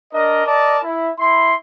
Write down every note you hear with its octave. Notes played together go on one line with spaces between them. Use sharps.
D4 A#4 D#5
A#4 D5 D#5 A5
E4
E4 C6